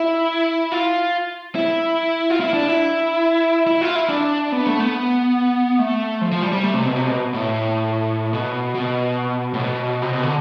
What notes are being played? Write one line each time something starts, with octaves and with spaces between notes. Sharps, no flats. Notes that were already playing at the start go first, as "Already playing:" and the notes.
Already playing: E4
F4
E4
F4
E4
D4
E4
E4
F4
E4
D4
B3
A3
B3
A3
F3
F3
G3
G3
A3
C3
B2
C3
B2
A2
B2
B2
A2
B2
C3
B2
D3